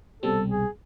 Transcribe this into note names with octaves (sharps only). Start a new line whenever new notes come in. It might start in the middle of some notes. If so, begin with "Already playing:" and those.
C2 B2 G3 C4 A4
G#4